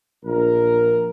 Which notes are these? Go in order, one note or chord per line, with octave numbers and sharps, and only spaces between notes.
A#1 A#4